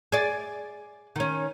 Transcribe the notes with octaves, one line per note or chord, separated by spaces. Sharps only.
G#4 D5
D#3 C#4